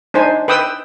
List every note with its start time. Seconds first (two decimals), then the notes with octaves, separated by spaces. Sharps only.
0.14 D4 D#4 C5 G#5
0.48 B4 G5 D#6 E6